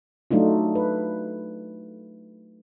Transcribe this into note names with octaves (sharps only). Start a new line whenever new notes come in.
F#3 A3 D4 D#4 F4
B4